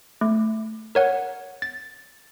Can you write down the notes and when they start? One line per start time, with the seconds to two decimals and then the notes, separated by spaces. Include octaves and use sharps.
0.21 A3
0.95 A#4 C#5 F#5
1.62 A6